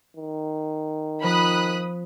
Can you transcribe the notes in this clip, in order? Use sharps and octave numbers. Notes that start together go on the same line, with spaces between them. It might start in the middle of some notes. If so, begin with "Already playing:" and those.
D#3
F3 B5 D#6 F#6